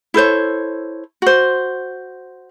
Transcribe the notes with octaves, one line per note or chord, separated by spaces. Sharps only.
E4 A4 C5 C#5
F#4 C5